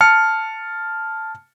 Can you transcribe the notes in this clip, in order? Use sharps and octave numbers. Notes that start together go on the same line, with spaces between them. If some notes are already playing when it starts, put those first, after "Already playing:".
A5 F6 C#7